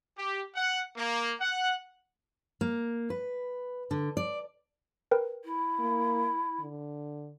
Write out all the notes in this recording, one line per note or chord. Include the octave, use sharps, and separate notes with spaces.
G4
F#5
A#3
F#5
A#3
B4
D3
D5
A#4 B4 G5
E4
A#3
D3